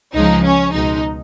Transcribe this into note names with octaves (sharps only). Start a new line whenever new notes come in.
C#2 C#3 F3 G#3 D#4
C#4
C#2 B2 G#3 D#4